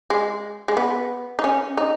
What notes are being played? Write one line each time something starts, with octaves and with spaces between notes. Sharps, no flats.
G#3
G#3
B3
D#4
C#4
D#4